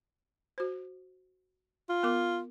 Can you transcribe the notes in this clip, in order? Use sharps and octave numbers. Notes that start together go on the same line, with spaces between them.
F#4 C5
F4
B3 A#4 D6